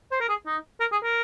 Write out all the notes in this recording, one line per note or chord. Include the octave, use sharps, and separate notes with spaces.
C5
A#4
G#4
D#4
A#4
G#4
A#4